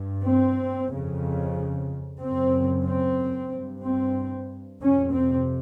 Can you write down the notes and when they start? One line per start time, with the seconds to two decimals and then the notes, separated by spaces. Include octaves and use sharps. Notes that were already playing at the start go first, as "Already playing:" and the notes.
Already playing: G2
0.25 C4
0.90 F2 C#3
2.20 F#2 C#3 C4
2.85 C4
3.50 G2
3.82 C4
4.80 F2 C3 C#4
5.13 C4